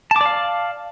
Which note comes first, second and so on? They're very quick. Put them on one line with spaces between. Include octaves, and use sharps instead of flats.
A5 D6 D5 F5